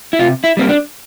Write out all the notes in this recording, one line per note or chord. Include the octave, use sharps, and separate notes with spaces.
E4
C3 F4
E4
G3 A#3 C4
D4